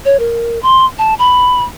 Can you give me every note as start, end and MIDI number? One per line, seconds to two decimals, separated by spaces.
0.05 0.17 73
0.19 0.59 70
0.63 0.85 84
0.99 1.14 81
1.19 1.63 83